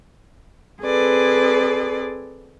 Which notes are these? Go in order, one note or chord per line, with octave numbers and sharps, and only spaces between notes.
C4 G#4 A4 B4 D5